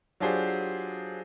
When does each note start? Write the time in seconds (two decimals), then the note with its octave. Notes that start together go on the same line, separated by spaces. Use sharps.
0.20 F#3 D4 F4 G4 G#4 C5